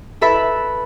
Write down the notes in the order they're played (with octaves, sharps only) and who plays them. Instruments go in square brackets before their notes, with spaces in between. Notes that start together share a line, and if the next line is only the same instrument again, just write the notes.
[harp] E4 A4 B4 E5 B5